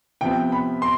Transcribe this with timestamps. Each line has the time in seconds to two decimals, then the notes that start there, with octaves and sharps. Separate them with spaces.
0.21 C3 F3 B3 G5
0.52 B5
0.82 C6